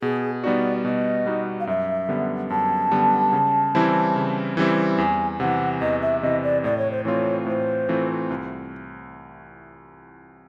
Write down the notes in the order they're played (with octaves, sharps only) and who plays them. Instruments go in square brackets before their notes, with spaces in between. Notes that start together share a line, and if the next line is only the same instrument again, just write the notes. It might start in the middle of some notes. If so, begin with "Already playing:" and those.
[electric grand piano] B2 [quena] G#4
[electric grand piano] G3 B3 D#4 F#4 [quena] D5
[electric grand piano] B2 [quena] D#5
[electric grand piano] G3 B3 D#4 F#4
[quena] F5
[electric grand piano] F#2 [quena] E5
[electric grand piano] D3 G3 B3
[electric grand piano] F#2 [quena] A5
[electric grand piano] D3 G3 B3
C#3
E3 G3 C4 E4
C#3
E3 G3 C4 E4
[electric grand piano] E2 [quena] G#5
[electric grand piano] C3 E3 [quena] F#5
[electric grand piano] E2 [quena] D#5
[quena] E5
[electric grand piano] C3 E3 [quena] D#5
[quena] D5
[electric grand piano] A2 [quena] D5
[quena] C#5
C5
[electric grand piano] E3 A3 C4 F4 [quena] C#5
[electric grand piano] A2 [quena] C5
[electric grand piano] E3 A3 C4 F4
C2